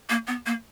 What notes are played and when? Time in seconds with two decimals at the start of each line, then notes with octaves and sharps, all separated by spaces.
0.10 A#3
0.27 B3
0.46 A#3